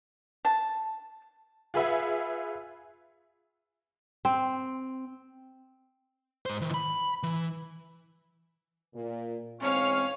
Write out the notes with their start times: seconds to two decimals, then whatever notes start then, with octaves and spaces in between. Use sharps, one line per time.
0.45 A5
1.74 F4 G#4 B4 E5 F#5
4.25 C4
6.46 G#2 C5
6.62 D#3 E3
6.74 B5
7.23 E3
8.94 A#2
9.61 E2 G#2 C4 C#4 C#5 F5 F6